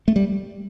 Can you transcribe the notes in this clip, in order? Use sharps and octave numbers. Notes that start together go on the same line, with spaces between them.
A3
G3